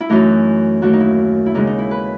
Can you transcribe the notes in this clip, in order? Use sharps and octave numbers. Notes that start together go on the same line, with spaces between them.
E4
F#2 E3 A3 D#4
D#2 D#3 A3 F#4
D#4
E4
E4
D#2 C#3 G#3 D#4
D#4
E4
B4